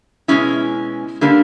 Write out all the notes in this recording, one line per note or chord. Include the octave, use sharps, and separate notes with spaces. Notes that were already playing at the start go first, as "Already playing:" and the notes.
B2 G#3 C#4 E4
D3 G3 A#3 D4